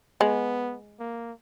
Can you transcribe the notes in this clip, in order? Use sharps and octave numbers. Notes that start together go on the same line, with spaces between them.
G#3 B3
A#3